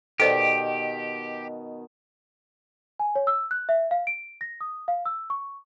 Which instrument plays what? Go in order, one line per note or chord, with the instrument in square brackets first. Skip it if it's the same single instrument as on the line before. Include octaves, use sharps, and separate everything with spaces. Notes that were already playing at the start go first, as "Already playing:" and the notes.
[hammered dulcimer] B2 D#3 [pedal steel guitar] G4 [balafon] A4 C5 D5
[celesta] G#5
C#5
E6
F#6
E5
F5
D7
A#6
D#6
F5
E6
C#6